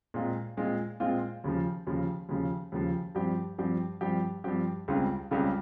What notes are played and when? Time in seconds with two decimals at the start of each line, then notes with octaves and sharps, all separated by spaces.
0.14 A#2 G#3 C4 F4
0.57 A#2 G#3 C4 F4
1.00 A#2 G#3 C4 F4
1.44 D#2 C#3 F3
1.87 D#2 C#3 F3
2.29 D#2 C#3 F3
2.72 D#2 C#3 F3
3.15 G2 F3 C4 G4
3.58 G2 F3 C4 G4
4.01 G2 F3 C4 G4
4.44 G2 F3 C4 G4
4.88 C#2 C#3 G3 C4 F4
5.31 C#2 C#3 G3 C4 F4